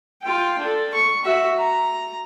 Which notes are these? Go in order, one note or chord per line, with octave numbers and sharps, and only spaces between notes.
F4 G5
D4 A4
C#6
F#4 E5
A#5